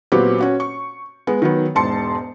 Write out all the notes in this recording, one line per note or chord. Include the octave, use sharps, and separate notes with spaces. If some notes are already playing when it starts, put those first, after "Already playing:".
A#2 F#3 B3 C4 F#4 G4
C#4 F#4
C#6
G#3 B3
D#3 F#3 B3
E1 G#2 A5 C6 C#7